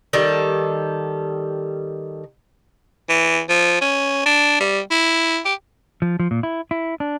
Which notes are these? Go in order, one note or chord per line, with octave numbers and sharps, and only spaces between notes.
D#3 G3 A4
E3
F3
C#4
D4
G3
E4
G4
F3
F3
A#2
E4
E4
D4